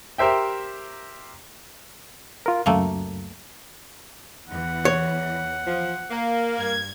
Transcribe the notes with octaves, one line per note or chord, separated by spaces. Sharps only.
G4 A#4 C5 E5 G5
F4 A#4
C#2 F#2 A3 A#3
E2 E3 F#5
C#5
F3
A#3
G2 G#6